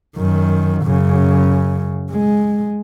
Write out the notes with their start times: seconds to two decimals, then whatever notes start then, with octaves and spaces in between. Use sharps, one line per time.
0.17 F#2 D#3
0.83 F#2 C#3
2.12 G#3